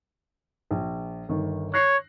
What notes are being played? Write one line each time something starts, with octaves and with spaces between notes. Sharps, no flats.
A#1
G1 D#3
C#5 F#6 A#6 C7